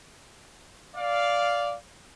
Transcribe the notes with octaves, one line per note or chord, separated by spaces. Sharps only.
D5 F5